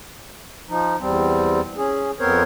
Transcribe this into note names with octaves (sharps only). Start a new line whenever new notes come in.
F3 D#4
E2 G3 C4
C#4 G#4
F2 B3 C4 A#4 C5 C#5